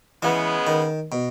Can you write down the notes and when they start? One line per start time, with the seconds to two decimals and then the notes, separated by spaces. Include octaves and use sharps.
0.23 C#3 E3 G#3 B3
0.67 D#3
1.12 B2